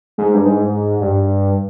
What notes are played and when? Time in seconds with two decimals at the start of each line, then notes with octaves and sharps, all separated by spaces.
0.18 G#2
0.34 G2
0.46 G#2
1.01 G2